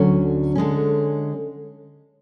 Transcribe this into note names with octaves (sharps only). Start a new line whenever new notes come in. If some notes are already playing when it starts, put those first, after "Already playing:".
Already playing: D2 D3 F#3 C#4
D3 G#3 C#4